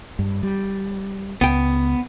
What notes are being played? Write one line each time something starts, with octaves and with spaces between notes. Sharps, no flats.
G2
G3
C#2 B3 G5